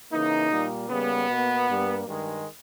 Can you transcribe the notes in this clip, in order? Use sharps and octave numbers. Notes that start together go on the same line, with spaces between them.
C#3 E3 A#3 D#4
A#2 G3 A#3
C#3 G3 A#3 B3
B2 A#3
G2 G3 A#3
G2 D#3 G#3